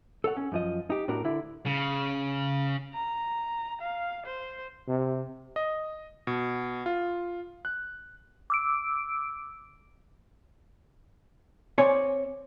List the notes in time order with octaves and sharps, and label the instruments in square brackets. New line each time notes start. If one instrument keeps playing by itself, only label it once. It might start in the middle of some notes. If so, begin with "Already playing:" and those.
[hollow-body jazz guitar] A4 C#5 F#5
C#4
F#2 F3 D#5
D#4 G4
A2 D4 F#4 A#4
D3 E4
[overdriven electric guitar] C#3
[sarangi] A#5
F5
C5
[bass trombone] C3
[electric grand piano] D#5
B2
F4
F#6
[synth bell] D6 E6 D7
[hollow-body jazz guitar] C4 C#5 D5 G#5